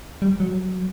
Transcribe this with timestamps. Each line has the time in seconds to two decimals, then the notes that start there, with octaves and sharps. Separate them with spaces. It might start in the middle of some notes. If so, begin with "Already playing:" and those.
0.22 G3
0.40 F#3